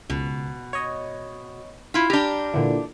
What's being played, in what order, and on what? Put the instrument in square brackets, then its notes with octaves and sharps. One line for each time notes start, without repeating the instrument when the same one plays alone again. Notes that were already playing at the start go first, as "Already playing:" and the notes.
[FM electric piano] C#2 [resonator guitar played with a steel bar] B2
[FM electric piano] C#5 D#5
[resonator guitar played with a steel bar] E4 F4 [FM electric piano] B6
[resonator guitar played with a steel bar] D4 G4 [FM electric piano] A#5 F6 G6
[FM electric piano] A#2 D3 E3